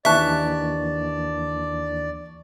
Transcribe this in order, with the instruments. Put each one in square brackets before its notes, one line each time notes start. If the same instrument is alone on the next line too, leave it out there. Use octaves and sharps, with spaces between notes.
[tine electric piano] D#2 E3 D4 [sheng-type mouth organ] D5 [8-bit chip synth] E5 F#6 [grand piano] A5 C#6